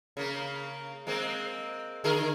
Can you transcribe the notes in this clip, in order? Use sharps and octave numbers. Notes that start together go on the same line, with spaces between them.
C#3 A#3
G#3 A#3 C4
D3 G#4 A#4